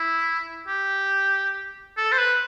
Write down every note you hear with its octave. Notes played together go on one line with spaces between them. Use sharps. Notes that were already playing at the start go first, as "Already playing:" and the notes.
Already playing: E4
G4
A4
C5
B4